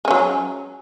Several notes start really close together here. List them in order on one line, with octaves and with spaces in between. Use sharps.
G#3 C#4 F#3